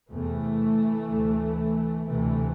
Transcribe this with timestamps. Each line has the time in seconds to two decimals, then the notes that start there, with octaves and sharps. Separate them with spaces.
0.10 E2 C3 E3 A3
1.09 D2 C3
2.07 D2 C3 E3 A3